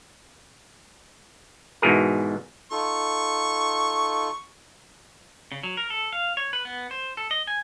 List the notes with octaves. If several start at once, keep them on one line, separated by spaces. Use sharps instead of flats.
G#2 B2 E3 G#4 A#4
D#4 F4 A4 C#6
C#3
F#3
A#4
A4
F5
C#5
B4
B3
C5
A4
D#5
G#5